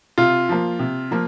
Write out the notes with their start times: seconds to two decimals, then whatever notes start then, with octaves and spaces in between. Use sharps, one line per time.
0.18 C3 F4
0.49 F3 A#3
0.79 C3
1.11 F3 A#3